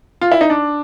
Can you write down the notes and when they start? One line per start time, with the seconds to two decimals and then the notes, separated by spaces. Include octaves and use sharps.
0.21 F4
0.32 E4
0.41 D#4
0.50 D4